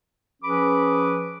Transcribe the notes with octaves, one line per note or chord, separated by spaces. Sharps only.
F3 C#4 G#4 B4 B5 D6